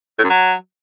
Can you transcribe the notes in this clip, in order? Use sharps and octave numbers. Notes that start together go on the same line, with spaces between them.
A2
F#2
F#3